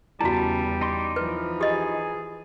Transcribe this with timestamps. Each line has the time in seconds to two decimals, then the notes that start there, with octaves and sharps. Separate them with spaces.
0.21 E2 C#3 G3 E4 F#4 A5
0.81 D#4 C6 D6
1.16 E3 F3 B4
1.61 G4 G#4 D#5